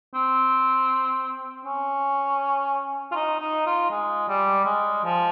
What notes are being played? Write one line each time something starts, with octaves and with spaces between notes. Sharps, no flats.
C4
C#4
F4
D#4
D#4
F4
G#3
G3
G#3
F3